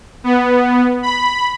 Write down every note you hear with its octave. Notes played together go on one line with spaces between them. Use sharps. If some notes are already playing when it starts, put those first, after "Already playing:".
B3
B5